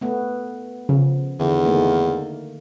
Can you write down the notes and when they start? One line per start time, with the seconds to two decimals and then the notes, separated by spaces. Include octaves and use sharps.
0.01 A3 B3
0.89 C#3 F3
1.39 E2 D3 D#3
1.65 D#3 A3 A#3